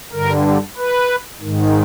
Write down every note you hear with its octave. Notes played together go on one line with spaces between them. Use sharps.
G2 D3 A#4
B4
G#2 D#3